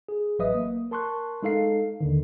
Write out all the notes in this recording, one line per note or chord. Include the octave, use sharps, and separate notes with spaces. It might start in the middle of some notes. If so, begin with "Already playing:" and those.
G#4
A1 F#3 B4 D#5 E5 D#6
A#3
A#4 A5 C6 C#6 F#6
G#3 D#4 A4 F5 C7
D#2 D3 D#3